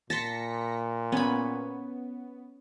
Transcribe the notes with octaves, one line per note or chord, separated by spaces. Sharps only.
A#2 A5 C6 A#6 B6 C#7
B3 C#4 B5